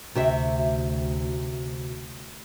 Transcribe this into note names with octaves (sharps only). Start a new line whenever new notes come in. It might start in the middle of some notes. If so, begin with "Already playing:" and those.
D2 C3 F#4 E5